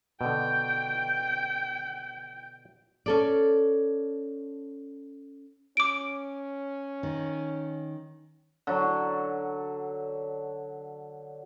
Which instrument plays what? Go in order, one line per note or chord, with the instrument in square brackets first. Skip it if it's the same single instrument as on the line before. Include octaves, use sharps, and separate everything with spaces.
[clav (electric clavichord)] B2 D3 [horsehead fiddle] G5
[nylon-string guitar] C#4 A4 D5
[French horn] C#4 [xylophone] D6 D7
[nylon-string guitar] D#3
[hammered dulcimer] D3 F#3